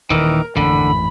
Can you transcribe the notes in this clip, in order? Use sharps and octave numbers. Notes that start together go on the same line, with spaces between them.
D#1 A#2 D#3 E3 A#4
A1 F2 G#2 D3 B5